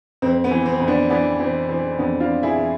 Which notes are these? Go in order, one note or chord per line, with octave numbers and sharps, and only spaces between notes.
F2 C4
B3
E3
C4
F2
B3 D4
E3 B3 D4
E3 C4
E3 C4
F2 B3 D4
D4 F4
F2
E4 G#4
E3